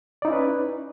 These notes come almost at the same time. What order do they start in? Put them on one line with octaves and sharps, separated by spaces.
D5 D#4 E4 C#4 B4